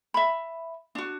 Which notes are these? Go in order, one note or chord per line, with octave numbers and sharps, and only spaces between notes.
E5 B5
D4 F#4